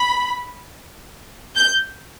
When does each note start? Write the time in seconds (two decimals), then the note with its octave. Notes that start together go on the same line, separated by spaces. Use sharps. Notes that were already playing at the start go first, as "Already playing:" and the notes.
Already playing: B5
1.56 G6